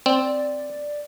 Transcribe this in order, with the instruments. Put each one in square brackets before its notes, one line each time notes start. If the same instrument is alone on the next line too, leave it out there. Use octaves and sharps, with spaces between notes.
[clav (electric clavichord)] C4 [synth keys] D5